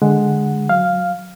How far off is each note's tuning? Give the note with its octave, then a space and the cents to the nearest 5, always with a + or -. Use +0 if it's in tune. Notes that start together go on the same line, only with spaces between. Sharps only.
D3 +0 G#3 +0 F#5 -5
F#3 -10 F5 +0